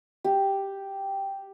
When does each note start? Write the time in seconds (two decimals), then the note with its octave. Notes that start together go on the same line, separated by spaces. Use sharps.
0.24 G4